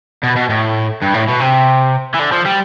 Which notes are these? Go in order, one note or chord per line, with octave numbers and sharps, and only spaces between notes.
B2
B2
A2
G2
A2
B2
C3
E3
D3
F3
G3